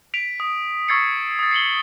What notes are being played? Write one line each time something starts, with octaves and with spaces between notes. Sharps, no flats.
B6 D7 F7
D#6
C#6 E6 G#6 A6 C7 C#7
D#6 A6
C7 C#7 F#7 G7